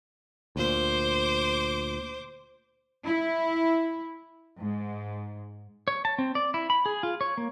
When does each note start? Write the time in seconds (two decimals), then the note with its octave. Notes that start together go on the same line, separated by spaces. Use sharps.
0.56 D2 A#2 C5 D6
3.05 E4
4.59 G#2
5.88 C#5
6.05 A5
6.18 C4
6.35 D5
6.54 E4
6.70 B5
6.86 G#4
7.03 F4
7.21 C#5
7.38 A#3